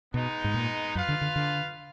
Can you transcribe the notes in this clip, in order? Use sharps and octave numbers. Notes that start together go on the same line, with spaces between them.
B2 G#3 B3 D#4
G#2
A#2
F#2 F4 B4 F5
D3
D3
D3